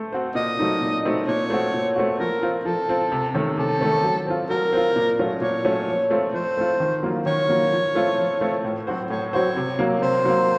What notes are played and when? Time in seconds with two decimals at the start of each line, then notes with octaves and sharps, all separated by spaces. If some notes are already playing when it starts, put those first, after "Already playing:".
Already playing: A3 C5
0.12 C4 F#4 C5
0.35 A#2 D#5
0.59 F#3 A3 C4 D#4
0.82 A#2
1.05 F#3 A3 C4 D#4
1.27 A#2 C#5
1.50 A3 C4 F#4
1.74 A#2
1.96 A3 C4 F#4
2.19 F3 A#4
2.43 C4 F4
2.65 F3 A4
2.89 C4 F4
3.12 C3
3.35 D#3 A3 C#4
3.58 C3 A4
3.81 D#3 A3 C#4
4.04 F#3
4.26 C4 F4
4.49 F#3 A#4
4.73 C4 F4
4.96 A#2
5.19 F#3 A3 C#4 F4
5.41 A#2 C#5
5.65 F#3 A3 C#4 F4
5.88 F3
6.10 A3 C4 F4
6.34 F3 C5
6.57 A3 C4 F4
6.80 D#3
7.03 F#3 A#3 F4
7.26 D#3 C#5
7.49 F#3 A#3 F4
7.72 F3
7.95 A3 C4 F4
8.18 F3
8.41 A3 C4 F4
8.65 A2
8.87 F#3 C4 F#4 C5
9.10 A2 C#5
9.33 F#3 C4 F#4 C5 C#5
9.56 C3
9.79 F#3 A#3
10.02 C3 C5
10.25 F#3 A#3